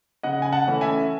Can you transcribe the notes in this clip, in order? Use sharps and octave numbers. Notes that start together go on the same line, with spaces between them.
C#3 D#5 F#5
G#5
F#5 A5
E3 A3 C#4
E5 G#5